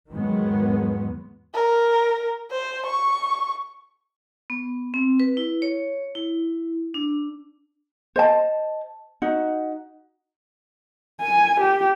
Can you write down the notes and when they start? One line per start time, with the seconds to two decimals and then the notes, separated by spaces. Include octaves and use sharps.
0.11 E2 G#2 D#3 F#3 G#3 B3
1.54 A#4
2.51 C5
2.86 C#6
4.50 B3
4.94 C4
5.20 B4
5.37 E4
5.62 C#5
6.15 E4
6.94 D4
8.16 C5 D#5 A5
9.22 D#4 F#4
11.20 G#5
11.60 G4